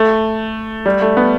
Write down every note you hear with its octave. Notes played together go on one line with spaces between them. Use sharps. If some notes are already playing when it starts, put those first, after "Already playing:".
Already playing: A3
G3
A3
B3